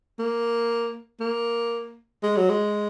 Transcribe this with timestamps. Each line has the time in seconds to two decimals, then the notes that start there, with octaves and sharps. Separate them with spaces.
0.19 A#3
1.20 A#3
2.23 G#3
2.37 F#3
2.49 G#3